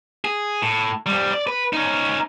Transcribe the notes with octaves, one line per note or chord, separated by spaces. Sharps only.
G#4
A2
F2 G3
D5
B4
C#4 D#4